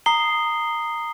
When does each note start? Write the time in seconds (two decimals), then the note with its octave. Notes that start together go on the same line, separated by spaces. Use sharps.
0.06 A#5 D#6 C7 G7